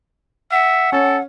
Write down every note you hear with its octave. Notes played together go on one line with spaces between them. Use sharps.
E5 F#5
C#4 A4